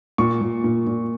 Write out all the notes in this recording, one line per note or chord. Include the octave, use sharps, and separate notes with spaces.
A#2 C#6
A#2
A#2
A#2